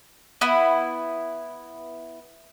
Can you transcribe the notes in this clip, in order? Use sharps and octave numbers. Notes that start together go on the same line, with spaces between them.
B3 E4